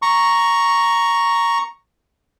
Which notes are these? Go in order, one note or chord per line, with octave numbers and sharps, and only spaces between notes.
A#5 C#6